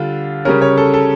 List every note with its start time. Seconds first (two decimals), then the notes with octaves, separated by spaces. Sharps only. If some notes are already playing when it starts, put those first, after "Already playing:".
Already playing: D3 G3 D4 F4
0.45 C#3 G3 C#4 A#4
0.62 C#5
0.77 A4
0.94 A4